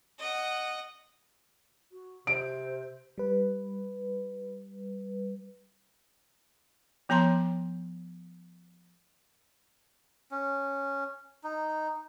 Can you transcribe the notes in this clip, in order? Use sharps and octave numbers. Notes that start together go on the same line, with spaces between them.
D#5 F#5
F#4
C3 C5 D7
G3 B4
F3 B3 C#5 A5 A#5 C6
C#4
D#4